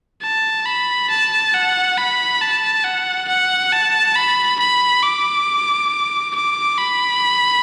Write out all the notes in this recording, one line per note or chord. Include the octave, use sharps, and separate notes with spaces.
A5
B5
A5
F#5
B5
A5
F#5
F#5
A5
B5
B5
D6
D6
B5